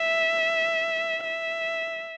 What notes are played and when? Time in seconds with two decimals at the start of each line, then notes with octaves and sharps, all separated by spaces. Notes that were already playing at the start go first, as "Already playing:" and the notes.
Already playing: E5
1.25 E5